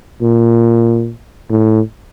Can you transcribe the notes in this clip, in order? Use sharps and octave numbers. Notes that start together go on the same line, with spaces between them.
A#2
A2